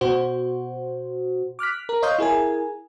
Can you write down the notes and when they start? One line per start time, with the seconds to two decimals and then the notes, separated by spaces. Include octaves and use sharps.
0.01 B2 F#4 C5
1.59 D6 F6 F#6 B6
1.89 A#4
2.02 C#5 D#5 F5 C6 D#6 G6
2.18 E4 G#4 A#4 G#5